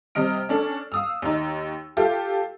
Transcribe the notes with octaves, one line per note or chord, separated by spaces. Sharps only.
C3 G3 D#5 F6 D7
C#4 D4 A4
F5 D#6 E6
D#2 D#4
F4 G4 A4